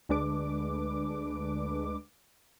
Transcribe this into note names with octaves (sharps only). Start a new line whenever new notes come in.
D2 D3 G#3 D4 B4 D6